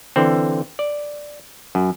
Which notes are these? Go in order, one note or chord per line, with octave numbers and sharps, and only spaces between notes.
D3 E3 C4
D5
F#2